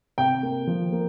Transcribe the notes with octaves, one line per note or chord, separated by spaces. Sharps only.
C3 G5
A#3
F3
A#3